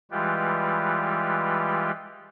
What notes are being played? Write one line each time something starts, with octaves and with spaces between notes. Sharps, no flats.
E3 G3 G#3 F4 G4 B4